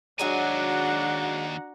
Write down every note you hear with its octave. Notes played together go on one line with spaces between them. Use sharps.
D#2 F#3 G#3 D4 F#4 F#5 G#5 A#5